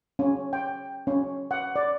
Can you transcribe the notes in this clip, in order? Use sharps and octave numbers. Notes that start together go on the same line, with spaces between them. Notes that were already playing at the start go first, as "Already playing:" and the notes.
C#4
G5
C#4
F#5
D5